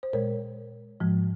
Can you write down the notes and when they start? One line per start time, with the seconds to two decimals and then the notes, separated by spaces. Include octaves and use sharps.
0.03 C5
0.13 A#2 G#3 A#4 C#5
1.00 G#2 F3 G#3